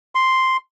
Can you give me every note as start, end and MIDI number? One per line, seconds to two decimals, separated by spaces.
0.15 0.57 84